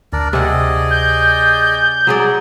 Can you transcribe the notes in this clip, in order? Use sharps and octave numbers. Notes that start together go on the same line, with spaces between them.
D2 D4 A#4 D5
C3 G#4 D5 D#5 F#5
G6
F#3 G#4 D5
A#5